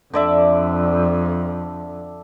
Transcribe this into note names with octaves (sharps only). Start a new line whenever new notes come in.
F2 D3 D5 E5